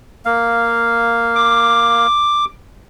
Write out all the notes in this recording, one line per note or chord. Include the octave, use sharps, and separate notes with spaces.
A#3 F5
D6